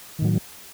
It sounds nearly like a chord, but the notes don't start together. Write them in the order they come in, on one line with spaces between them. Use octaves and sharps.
D#3 A2 F#3